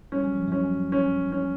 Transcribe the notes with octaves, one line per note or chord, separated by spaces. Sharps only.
G3 C#4
F#3
F3
F#2 F#3 C#4
C#4
C#4